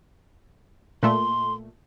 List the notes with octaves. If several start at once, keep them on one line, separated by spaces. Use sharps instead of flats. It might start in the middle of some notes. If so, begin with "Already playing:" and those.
A#2 A3 C6